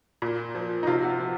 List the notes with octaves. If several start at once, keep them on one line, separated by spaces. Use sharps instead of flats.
A#2
F3
D#4
C3 F4
F#4
F4
F3